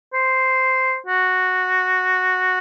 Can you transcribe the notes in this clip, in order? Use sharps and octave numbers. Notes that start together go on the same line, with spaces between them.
C5
F#4